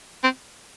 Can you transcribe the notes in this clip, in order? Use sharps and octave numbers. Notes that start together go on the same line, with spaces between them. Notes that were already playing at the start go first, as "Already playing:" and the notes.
C4